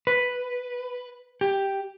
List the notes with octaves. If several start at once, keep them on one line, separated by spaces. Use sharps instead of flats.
B4
G4